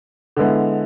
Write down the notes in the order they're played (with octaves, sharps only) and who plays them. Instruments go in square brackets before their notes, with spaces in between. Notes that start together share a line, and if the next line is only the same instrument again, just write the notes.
[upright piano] D3 G#3 B3 E4